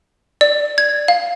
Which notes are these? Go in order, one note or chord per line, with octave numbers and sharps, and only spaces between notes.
D5
G#6
F5